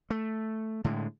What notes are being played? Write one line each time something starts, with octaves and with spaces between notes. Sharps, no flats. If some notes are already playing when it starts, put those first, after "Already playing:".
A3
A2 D3 G#3